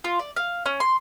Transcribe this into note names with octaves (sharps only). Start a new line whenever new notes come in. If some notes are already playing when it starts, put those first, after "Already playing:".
F4
D5
F5
C#4
C6